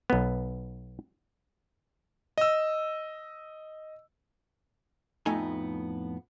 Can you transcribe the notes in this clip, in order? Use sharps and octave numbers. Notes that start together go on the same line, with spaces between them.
B1 B3
D#5 E6
F2 A2 A3 B3 D#4 G#5